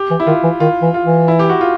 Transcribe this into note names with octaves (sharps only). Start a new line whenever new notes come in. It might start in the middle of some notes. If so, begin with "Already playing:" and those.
Already playing: G4
E3
E4
D#3 F4
E3
D#3 F4
E3
F4
E3
E4
G4
F#4
F4